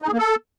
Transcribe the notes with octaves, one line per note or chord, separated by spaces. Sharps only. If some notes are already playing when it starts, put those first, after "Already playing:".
D#4
G#4
A#3
A4